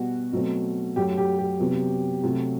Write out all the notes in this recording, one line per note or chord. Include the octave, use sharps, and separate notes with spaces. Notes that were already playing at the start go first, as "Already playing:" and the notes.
Already playing: B2 G3 B3 F#4
B2 F#3 A3 C4
F#2 F#3 A3 G4
G4
G4
C3 F#3 B3
C3 F#3 A3